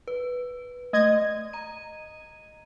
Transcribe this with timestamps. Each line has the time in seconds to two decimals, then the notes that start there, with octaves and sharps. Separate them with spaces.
0.08 B4
0.93 A3 D#5 G#6
1.53 A#5 D#7